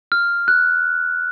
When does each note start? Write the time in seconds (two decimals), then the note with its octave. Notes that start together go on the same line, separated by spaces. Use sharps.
0.12 F6
0.48 F#6